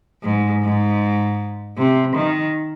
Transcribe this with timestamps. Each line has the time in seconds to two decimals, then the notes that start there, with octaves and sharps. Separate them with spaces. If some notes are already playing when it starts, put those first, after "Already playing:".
0.24 G#2
0.63 G#2
1.78 C3
2.16 D#3